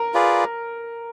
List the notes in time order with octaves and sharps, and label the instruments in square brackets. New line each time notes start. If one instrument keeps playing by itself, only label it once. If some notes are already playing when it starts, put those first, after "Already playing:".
Already playing: [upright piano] A#4
[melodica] F4 G#4 B4 D5